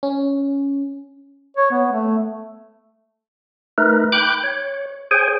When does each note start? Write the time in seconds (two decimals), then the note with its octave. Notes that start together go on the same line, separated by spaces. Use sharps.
0.03 C#4
1.57 C#5
1.71 B3
1.92 A3
3.78 A3 D#4 A#4 B4
4.12 G5 B5 D6 F#6 G6
4.44 C#5
5.11 G#4 C5 C#5 G5 G#5